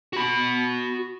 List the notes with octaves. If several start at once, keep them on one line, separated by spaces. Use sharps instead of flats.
F#4 B5